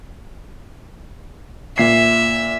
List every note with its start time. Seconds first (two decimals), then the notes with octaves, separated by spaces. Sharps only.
1.78 A#2 E5 C7